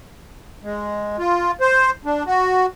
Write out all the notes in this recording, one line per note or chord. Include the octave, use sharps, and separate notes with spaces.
G#3
F4
C5
D4
F#4